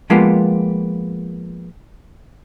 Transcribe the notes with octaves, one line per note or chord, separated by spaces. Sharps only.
F3 G#3 A#3 B3 F4 G4